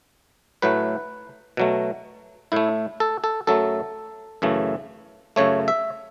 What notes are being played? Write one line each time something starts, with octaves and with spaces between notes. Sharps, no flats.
A2 F#3 A3 B4
B2 F#3 A3
A2 A3 E4
A4
A4
F#2 F#3 A3 A4
F#2 C#3 E3 A3
F#2 C#3 A3 C#5
E5